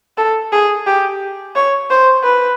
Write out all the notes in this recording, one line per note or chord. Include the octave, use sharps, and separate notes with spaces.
A4
G#4
G4
C#5
C5
B4